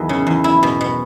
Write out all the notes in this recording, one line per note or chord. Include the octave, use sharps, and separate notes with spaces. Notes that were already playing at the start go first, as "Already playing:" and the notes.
Already playing: E2 D#3 E3 F#3
C#3
E2
E4
B2
B2